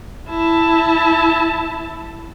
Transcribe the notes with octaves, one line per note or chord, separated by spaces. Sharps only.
E4 A5